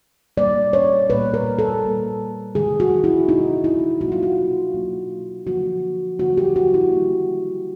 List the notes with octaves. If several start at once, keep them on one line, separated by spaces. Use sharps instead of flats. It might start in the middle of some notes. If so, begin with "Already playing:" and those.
A#2 G3 A#3 D5
C#5
A#2 G3 A#3 B4
A#4
A4
A#2 G3 A#3
C3 D#3 G#3 G#4
F#4
E4
C3 D#3 G#3 D#4
E4
B2 F#3 A#3 F#4
F4
F#4
B2 F#3 A#3
D3 F3 A#3 F#4
D3 F3 A#3 F#4
G4
F#4
E4
D#3 G3 A#3